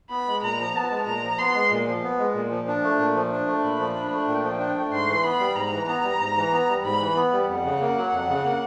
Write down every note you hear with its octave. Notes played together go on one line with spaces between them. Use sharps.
B3 B5
G#3
A#2 A#5
F3
B3 A5
G#3
A#2 A#5
F3
B3 C6
G#3
A#2
F3
B3
G#3
A#2
F3
D4
A3
A#2
F3
D4
A3
A#2 B5
F3
D4
A3
A#2 G5
F3
D4
A3
G#2 C6
E3
B3 B5
G3
G#2 A#5
E3
B3 A#5
G3
G#2
E3
B3
G3
G#2 B5
E3
B3
G3
F2 F#5
C#3
A#3
F#3
F2
C#3
A#3